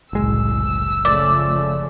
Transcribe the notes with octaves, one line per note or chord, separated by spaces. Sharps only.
F#1 C2 A2 G#3 E6
C#3 F3 A3 D5